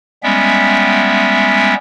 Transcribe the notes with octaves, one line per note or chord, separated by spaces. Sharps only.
G3 G#3 B3 C#4 E5 G5